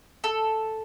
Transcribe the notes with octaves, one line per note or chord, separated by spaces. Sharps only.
A4